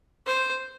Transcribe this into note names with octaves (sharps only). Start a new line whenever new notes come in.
C5